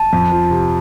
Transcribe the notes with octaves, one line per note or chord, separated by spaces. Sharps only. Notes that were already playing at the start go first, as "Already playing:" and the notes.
Already playing: A5
F2
F3
C3